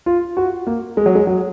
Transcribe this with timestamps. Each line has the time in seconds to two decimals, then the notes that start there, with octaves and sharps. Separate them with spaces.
0.06 F4
0.37 F#4
0.67 A#3
0.97 G#3
1.06 F#3
1.15 G#3
1.27 F#3